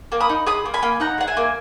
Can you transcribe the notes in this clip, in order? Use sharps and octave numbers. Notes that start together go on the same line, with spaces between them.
A#3
B5 D#6
D#4
G#4 B5 D#6
A#3
G#5 B5
A#3
D#4 F#5 A#5
G#4 F#5
E5 G#5
A#3